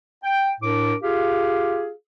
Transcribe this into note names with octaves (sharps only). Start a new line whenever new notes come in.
G5
A2 D4 A#4 D6
F4 G4 G#4 F5